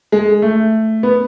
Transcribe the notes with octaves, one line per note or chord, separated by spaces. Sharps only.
G#3
A3
B3